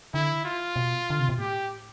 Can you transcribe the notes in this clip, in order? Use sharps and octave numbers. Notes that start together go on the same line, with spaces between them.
D3 E4
F4
B2
D3
C3
B2
A2 G4